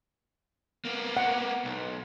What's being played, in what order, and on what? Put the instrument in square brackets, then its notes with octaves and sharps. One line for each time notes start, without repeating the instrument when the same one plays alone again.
[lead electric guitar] A#3 B3
[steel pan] F#5
[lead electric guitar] B1